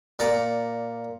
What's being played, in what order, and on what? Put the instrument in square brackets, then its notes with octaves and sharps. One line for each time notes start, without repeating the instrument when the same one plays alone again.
[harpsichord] A#2 D5 A#5